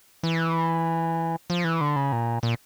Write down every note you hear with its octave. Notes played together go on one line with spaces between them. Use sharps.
E3
F3
E3
D3
C#3
A#2
A#2